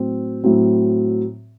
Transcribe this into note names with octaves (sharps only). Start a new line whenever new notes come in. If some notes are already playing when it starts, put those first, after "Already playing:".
Already playing: A2 F#3 C4
A2 F#3 C4